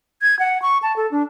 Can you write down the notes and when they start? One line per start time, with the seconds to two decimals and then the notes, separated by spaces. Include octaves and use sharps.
0.22 G#6
0.39 F#5
0.62 C#6
0.83 A5
0.97 A4
1.11 D4